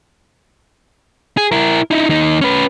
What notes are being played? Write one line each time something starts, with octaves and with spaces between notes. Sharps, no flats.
G#4
E4 A#4
D#4 E4
D#2 D#4
C#4 B4